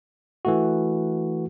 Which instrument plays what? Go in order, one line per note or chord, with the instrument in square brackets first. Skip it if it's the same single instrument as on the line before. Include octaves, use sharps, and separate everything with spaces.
[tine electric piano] E3 A3 F#4